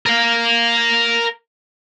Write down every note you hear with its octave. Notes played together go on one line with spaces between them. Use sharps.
A#4 F5